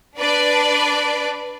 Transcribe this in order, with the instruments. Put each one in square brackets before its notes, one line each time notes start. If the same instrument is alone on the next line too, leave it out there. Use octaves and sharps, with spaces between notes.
[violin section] D4 B4 D5